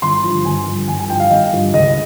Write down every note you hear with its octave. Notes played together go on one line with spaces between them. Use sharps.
G1 C6
G2 F3
G1 G#5
G2 F3
G1 G#5
G#5
G2 F3 G5
F5
G1 D#5
G2 F3
C#2 D#5